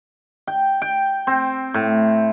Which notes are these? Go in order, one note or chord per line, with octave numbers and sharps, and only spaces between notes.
G5
G5
C4
A2